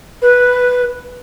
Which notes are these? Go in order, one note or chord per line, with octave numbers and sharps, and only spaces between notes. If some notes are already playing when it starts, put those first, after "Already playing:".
B4